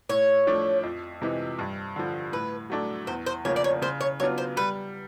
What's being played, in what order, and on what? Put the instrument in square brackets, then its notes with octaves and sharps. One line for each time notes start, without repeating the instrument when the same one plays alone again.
[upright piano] A2 [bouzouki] C#5
[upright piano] F3 A3 D4
F2
C3 E3 G#3
G2
D3 F3
[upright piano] A2 [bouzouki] B4
[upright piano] F#3 A3 D4
[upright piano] E2 [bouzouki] C5
[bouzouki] C5
[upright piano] C#3 F3 A#3 [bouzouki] C#5
[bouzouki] D5
C#5
[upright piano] C#3 [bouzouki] C5
[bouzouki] C#5
[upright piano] F#3 B3 D4 F4 [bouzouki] C#5
[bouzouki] C5
[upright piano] G3 [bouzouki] B4